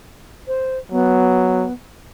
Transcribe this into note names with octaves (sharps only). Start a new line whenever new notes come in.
C5
F#3 B3